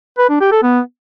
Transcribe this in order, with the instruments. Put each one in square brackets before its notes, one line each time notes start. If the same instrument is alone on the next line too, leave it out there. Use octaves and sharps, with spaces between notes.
[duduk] B4
D4
G4
A4
B3